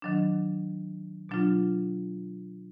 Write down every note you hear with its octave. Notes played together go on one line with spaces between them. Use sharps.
D#3 F#3 D4
B2 F#3 D4 F4